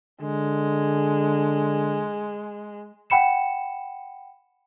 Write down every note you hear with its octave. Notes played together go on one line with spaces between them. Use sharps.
D3 G#3
F#5 G5 B5 C#7 E7